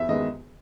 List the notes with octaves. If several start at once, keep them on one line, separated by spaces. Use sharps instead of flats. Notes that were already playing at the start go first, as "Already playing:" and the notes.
Already playing: E2 E5
D#3 G#3 B3 D#5